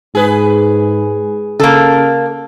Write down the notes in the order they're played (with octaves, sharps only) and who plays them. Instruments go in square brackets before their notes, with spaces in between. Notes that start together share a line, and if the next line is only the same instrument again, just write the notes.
[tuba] G#2 [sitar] G#4 B4
[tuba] C#3 [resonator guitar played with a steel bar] A#3 A4